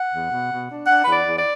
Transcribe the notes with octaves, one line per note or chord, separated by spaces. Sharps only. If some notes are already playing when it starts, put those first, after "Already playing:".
Already playing: F#5
E2
B2
B2
D4
D4 F#5
E2 B4
D5
E2
D5